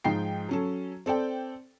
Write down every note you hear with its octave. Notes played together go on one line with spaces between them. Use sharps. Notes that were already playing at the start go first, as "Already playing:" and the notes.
G#2 F3 D#4 G5 C7
F#3 C#4 A4
C4 A4 D5 G5